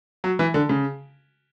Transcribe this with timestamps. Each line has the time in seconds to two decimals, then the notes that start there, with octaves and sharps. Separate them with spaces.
0.24 F#3
0.39 E3
0.54 D3
0.69 C#3